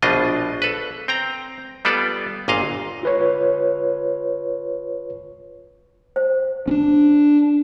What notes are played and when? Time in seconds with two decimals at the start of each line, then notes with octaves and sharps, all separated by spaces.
0.02 A#1 B2 D4 F4 D#5
0.62 A4 B4
1.08 C4 G5 A#5
1.85 G3 B3 F4 A4 D5
2.48 G1 A#2 D#5 F5
3.03 F4 B4 C#5
6.16 C5
6.68 C#4 D4